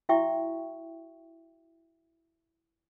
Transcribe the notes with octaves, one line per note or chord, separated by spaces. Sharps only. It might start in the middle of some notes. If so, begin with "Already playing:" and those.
E4 F#4 E5 G5 C#6